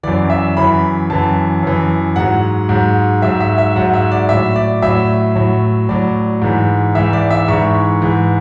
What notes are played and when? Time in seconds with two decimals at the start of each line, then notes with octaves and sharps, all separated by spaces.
0.03 F#2 E3 D5
0.30 E5
0.57 F#2 E3 B5
1.10 F#2 E3 A5
1.63 F#2 E3
2.16 G#2 F#3 F#5
2.69 G#2 F#3
3.22 G#2 F#3 E5
3.40 E5
3.58 E5
3.76 G#2 F#3 F#5
3.94 E5
4.11 D5
4.29 A2 F#3 E5
4.56 D5
4.82 A2 F#3 E5
5.35 A2 F#3
5.89 A2 F#3 D5
6.42 G#2 E3
6.95 G#2 E3 E5
7.13 D5
7.30 E5
7.48 G#2 E3 C#6
8.02 G#2 E3